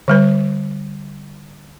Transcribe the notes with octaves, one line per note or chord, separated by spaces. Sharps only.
D3 G3 B4